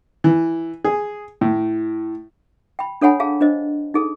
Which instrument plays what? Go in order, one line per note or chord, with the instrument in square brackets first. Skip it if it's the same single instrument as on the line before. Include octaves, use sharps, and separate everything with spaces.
[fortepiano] E3
G#4
A2
[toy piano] G5 B5
D4 A4 C#5 F#5 G#5 B5
G#4 F5 A5
D4 C5 D#5
D#4 G#4 A4